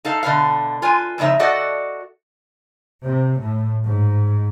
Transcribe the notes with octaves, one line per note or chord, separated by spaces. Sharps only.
D#4 A4 F5
B2 D3 B4 F5
F4 B4 G#5
F2 A2 C#3 D#4 E5
F#4 A4 D5 D#5 F#5
C3
A2
G#2